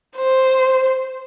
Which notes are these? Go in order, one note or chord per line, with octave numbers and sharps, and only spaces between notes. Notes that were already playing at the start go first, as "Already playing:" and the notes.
C5